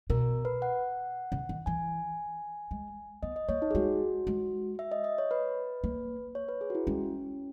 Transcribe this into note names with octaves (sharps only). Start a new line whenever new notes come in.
B2 A#4
B4
F#5
C#3
D#3
E3 G#5
G#3
B3 D#5
D#5
A#3 C#5
D#4
G#4
G#3 F#4
G#3
E5
D#5
D#5
C#5
B4
A#3
C#5
B4
G#4
F#4
E4
G#3 C#4